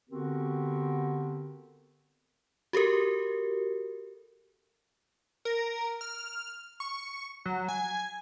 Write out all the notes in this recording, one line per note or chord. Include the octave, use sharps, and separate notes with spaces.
D3 B3 C4 F#4 G4 A#4
F#4 G4 A4 A#4
A#4
F6
C#6
F#3
G#5